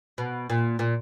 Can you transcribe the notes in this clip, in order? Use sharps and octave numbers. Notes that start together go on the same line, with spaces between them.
B2
A#2
A#2